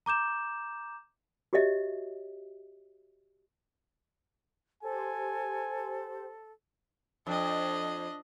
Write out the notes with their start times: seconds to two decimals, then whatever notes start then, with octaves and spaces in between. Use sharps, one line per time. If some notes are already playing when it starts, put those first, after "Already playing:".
0.06 A#5 D6 G6 E7
1.53 F#4 G4 C#5 D#5 E5
4.83 G4 A4 C5 G#5
7.27 F2 D4 D#5